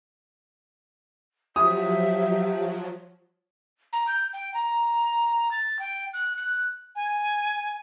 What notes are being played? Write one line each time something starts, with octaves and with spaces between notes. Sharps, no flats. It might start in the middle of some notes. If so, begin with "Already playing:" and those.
F3 F#3 G4 E5 D#6
A#5
G6
G5
A#5
A6
G5
F#6
F#6
G#5